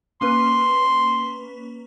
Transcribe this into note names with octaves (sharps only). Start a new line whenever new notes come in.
A#3 C#4 B4 C6